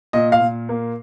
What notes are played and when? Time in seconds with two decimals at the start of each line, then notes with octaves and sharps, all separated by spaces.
0.13 A#2 D#5
0.32 F5
0.40 A#2
0.69 A#3